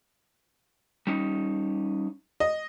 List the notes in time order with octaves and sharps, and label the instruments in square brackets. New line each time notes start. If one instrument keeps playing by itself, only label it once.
[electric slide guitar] G3 C#4 D#4
[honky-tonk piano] D#5